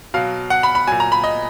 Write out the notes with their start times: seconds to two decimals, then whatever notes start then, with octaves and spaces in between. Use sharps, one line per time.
0.14 B2 F#3 F5
0.50 F#5
0.63 B5
0.75 B5
0.87 A#2 F#3 G#5
1.00 A#5
1.12 B5
1.24 D#5